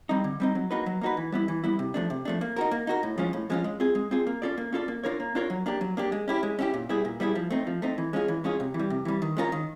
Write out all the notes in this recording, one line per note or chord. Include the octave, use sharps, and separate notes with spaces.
G3 C4 D#4
D3
G3 C4 D#4
F#3
A#3 D#4 F#4 B4
F#3
A#3 D#4 F#4 B4
E3
G3 B3 E4
E3
G3 B3 E4
C3
F3 A3 D4
C3
F3 A3 D4
A#3
D#4 F#4 A#4
A#3
D#4 F#4 A#4
A2
F3 G#3 C#4 F4
A2
F3 G#3 C#4 F4
G#3
C4 F4 G#4
G#3
C4 F4 G#4
A#3
C#4 F4 A4 D5
A#3
C#4 F4 A4 D5
A#3
D4 F4 A#4 C#5
A#3
D4 F4 A#4 C#5
F#3
A#3 D4 G4
F#3
A#3 D4 G4
G#3
C#4 E4 G4
G#3
C#4 E4 G4
A#2
G3 B3 E4 G#4
A#2
G3 B3 E4 G#4
F3
A3 C4 D#4
F3
A3 C4 D#4
E3
G#3 C#4 F4 G#4
E3
G#3 C#4 F4 G#4
C3
E3
G3
C3
E3 G3
D#3
G#3 C#4 F4 A#4
D#3